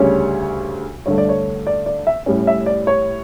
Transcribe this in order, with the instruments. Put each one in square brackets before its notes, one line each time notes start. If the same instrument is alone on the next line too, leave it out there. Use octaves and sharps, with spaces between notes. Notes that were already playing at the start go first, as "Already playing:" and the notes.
Already playing: [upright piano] D2 C#3 G3 C#4 C#5
G2 D3 A3 C#5
D5
C#5
D5
D5
E5
A2 G3 C#4
E5
D5
C#5